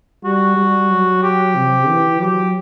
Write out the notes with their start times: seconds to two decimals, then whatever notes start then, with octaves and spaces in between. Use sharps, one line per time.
0.25 G3 F#4
0.57 G3
0.90 F#3
1.23 G4
1.55 C3
1.89 E3
2.21 F#3 G4